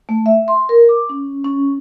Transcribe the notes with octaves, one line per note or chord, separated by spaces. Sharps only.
A3
E5
C6
A#4
D6
C#4
C#4